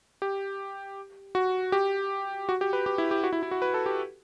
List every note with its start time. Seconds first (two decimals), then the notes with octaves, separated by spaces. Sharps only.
0.22 G4
1.35 F#4
1.72 G4
2.49 F#4
2.61 G4
2.73 B4
2.86 G4
2.98 E4
3.11 G4
3.24 F#4
3.33 E4
3.43 E4
3.51 F#4
3.62 B4
3.74 A4
3.86 G4